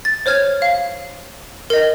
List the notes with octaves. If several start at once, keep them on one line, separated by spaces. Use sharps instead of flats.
A6
C5 C#5 F6 G#6
F5
A#4 D#5